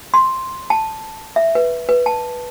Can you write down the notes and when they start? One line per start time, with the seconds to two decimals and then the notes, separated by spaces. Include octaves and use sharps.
0.14 C6
0.70 A5
1.36 E5
1.55 B4
1.89 B4
2.06 A5